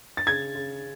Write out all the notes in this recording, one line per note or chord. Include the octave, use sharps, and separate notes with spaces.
A6
C#3 G#6
C#3